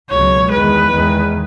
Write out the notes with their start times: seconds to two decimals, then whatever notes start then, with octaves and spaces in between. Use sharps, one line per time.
0.10 C#2 B2 F#3 C#5
0.51 E2 D#3 G#3 B4
0.92 E2 D#3 G#3